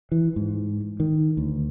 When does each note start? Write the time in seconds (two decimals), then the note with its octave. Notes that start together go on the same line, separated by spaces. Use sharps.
0.12 E3
0.36 G#2
1.00 D#3
1.37 D2